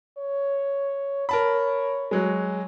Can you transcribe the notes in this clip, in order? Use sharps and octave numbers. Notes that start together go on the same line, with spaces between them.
C#5
A#4 C#5 A5 B5
F#3 G#3